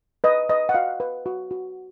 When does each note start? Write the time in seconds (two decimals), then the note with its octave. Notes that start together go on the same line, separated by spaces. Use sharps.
0.24 B4 D#5
0.49 B4 D#5
0.69 F#5
0.74 F#4 F5
1.00 B4
1.26 F#4
1.51 F#4